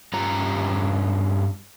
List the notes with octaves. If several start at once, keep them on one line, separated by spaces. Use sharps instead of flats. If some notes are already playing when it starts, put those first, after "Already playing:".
G2 C#4 F4 G4 A#5